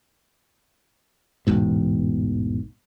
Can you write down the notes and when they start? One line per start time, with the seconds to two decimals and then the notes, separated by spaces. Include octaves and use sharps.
1.47 A1 E2 G#2 B2